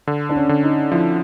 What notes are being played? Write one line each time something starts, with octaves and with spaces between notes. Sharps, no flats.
D3
D4
C#4
D3
D#4
F3 E4